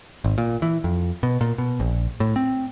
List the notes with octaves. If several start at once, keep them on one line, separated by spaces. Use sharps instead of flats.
G#1
A#2
E3
F2
B2
A#2
B2
A#1
A2
C4